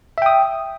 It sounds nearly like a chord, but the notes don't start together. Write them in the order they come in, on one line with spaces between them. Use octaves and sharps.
E5 G5 D#6